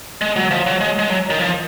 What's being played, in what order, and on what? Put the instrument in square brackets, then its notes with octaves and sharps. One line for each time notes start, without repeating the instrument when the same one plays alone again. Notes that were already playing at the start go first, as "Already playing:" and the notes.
[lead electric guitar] G#3
F#3
F3
F#3
G#3
G#3
F#3
D#3
F3